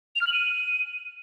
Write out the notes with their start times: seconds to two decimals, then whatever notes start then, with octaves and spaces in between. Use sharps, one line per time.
0.16 F7
0.21 F6
0.27 F#7
0.33 D#7